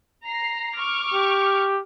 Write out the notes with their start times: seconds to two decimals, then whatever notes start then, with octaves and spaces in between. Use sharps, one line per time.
0.25 A#5 C7
0.77 C#6 D6 F6
1.14 G4